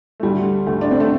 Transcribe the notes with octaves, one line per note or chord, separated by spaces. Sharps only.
A3
D2 G3
D2 A3
D4
C4
A3